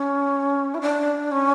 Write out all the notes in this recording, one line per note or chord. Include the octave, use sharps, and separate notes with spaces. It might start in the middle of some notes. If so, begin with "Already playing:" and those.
Already playing: C#4
E4
D4
C#4